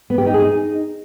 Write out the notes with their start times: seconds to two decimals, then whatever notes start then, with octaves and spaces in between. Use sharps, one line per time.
0.10 B3
0.18 G4
0.26 D#4
0.34 G#4
0.42 D#4